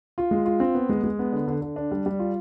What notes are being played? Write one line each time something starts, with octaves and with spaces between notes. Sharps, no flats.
F4
G#3
F4
C4
B3
G#3
G#3
B3
D3
D3
D3
D4
G3
G3
F4